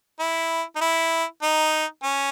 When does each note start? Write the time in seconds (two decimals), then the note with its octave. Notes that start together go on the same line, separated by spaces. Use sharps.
0.20 E4
0.76 D#4
0.81 E4
1.42 D#4
2.03 C#4